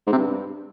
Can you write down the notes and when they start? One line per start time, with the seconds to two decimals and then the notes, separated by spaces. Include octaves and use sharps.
0.07 G#2
0.12 C3
0.18 G2